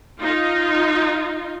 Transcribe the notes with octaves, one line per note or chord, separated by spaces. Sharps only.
D#4 F4